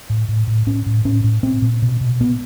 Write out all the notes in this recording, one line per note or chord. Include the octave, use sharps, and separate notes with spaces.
A2
A2
A2
A2 C#4
A2
A2 C#4
A2
A#2 C4
A#2
B2
B2
A#2 B3